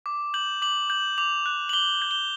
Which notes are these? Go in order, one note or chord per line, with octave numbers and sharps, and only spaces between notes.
D6
G6 F#7
D6 F#7
G6 F#7
D6 F7
F#6
F#7
D6 G7
G6
G7